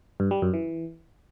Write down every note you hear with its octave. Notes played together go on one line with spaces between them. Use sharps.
G2
G3
F#2
E3